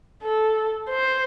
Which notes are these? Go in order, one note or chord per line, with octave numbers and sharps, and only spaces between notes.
A4
C5